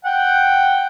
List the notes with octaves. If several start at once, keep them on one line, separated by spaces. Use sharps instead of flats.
F#5 G5